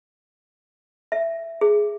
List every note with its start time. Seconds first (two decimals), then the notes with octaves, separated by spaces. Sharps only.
1.12 E5
1.61 G#4